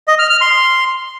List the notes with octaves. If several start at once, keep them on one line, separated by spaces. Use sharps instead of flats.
D#5
F6
F6
C6